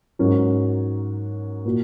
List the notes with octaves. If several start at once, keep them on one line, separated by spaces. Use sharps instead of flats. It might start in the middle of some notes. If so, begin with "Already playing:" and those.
G#2 F#3 C#4 F#4 A#4
A#2 A#3 F#4